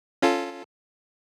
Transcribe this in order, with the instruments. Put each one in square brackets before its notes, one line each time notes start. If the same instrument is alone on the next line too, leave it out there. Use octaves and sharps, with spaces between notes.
[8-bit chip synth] C#4 F4 A4